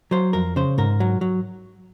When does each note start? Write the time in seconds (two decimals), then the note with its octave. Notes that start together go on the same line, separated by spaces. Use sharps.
0.11 F#3 C5
0.33 F2 A#4
0.56 C#3 C5
0.78 G#2 A#4
1.00 F#3
1.21 F#3